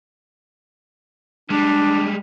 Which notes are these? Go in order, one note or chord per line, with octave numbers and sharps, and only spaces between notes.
G3 G#3 D4